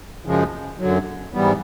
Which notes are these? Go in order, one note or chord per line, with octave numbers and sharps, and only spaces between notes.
F#2 C#3 F3 G#3
F#2 D3 F#3
G#2 E3 G3 B3